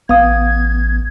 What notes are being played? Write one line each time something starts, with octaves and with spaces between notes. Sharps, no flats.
A1 B3 F5 D#6 G#6